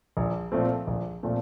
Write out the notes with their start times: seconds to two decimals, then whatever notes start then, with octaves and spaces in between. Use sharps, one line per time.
0.17 A#1
0.52 A#2 F3 A3 C4
0.87 A#1
1.23 A#2 F3 A3 C4